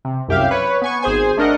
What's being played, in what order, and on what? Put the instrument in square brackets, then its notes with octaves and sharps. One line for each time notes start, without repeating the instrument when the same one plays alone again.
[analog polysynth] C3
C2 F#2 G4 E5 F5
B4 C#5
B3 G#5 C#6
G#1 G#4 C5 G#5
A3 D4 A#4 D#5 F#5